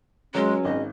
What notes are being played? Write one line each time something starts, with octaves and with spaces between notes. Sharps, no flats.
C#2 C#3 F#3 G#3 C#4
G#1 D#5